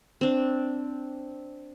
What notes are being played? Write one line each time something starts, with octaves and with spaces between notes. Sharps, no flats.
C4 D4